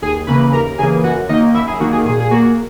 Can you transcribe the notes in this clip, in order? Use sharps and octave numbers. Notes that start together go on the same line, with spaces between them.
D#2 G#4 G#5
C#3 E3 A#3 B4 B5
D#2 A#4 A#5
C#3 E3 A#3 G#4 G#5
F#2 F#4 F#5
D#3 A#3 D#4 D#5
F#2 E4 E5
G#4
D#3 A#3 F#4
G#4
A#2 G#4
G#4
A#3 F#4